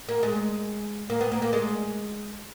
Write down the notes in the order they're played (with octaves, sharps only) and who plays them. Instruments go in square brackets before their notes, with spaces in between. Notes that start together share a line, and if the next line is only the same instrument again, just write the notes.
[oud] A#3
G#3
A#3
B3
A#3
A#3
G#3